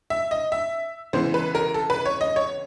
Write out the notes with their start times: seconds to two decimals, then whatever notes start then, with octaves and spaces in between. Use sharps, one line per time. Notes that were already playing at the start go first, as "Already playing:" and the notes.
0.10 E5
0.31 D#5
0.52 E5
1.13 C#3 E3 G#3 B3 E4 C5
1.34 B4
1.55 A#4
1.74 A4
1.90 B4
2.05 C#5
2.21 D#5
2.36 C#5